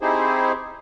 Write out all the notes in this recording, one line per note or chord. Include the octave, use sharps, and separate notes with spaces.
C4 D#4 E4 G4 G#4 C5